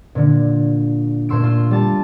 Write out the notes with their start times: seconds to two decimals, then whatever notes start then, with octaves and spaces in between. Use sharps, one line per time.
0.15 A#2 D3
1.29 A#2 A3 C6 E6 D7
1.43 F4
1.71 G3 A5 A6